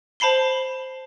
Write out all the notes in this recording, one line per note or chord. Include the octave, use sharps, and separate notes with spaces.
C5 A5 B5 C7 G7